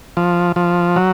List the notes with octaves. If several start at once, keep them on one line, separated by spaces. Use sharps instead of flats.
F3
F3
F#3